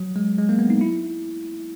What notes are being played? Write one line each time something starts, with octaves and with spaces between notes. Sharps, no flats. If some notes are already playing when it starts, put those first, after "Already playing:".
Already playing: F#3
G#3
G#3
A#3
B3
D#4
E4